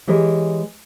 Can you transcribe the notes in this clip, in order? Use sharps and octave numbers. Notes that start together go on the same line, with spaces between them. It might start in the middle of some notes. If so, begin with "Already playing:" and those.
E3 G#3 G4 A#4 C#5